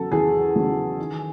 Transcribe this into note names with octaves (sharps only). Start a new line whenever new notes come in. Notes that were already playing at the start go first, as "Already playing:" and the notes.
Already playing: E2 C#3 F#3 A4
E2 G#4
C#3 F#3
D#3